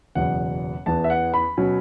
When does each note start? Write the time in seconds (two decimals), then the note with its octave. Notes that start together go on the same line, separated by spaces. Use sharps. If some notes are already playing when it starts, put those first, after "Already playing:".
0.15 F#1 E2 B2 F#3 B3 F#5
0.86 E2 E3 B3 A5
1.04 E5
1.10 F#5
1.34 B5
1.57 B2 F#3 C#4